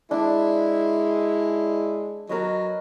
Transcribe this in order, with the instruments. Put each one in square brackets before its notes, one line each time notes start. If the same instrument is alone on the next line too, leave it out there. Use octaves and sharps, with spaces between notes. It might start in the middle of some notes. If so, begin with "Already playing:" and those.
[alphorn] G#3 [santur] D4 [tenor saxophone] E4
[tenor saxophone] F#3 [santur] A#4 B4 D#5